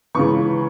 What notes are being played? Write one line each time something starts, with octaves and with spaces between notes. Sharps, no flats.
C#2 C#3 E3 C#6